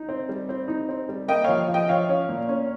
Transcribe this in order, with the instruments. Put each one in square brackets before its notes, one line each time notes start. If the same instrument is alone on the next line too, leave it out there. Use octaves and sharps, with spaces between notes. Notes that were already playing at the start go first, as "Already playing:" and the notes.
Already playing: [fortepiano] D#4
C4
G3
C4
D#4
C4
G3
[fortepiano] A#3 [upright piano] D#5 G5
[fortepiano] F3 [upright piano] C#5 F5
[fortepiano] F3
[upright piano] D#5 G5
[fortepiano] F3 [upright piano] C#5 F5
[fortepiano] C#4
A#2
C#4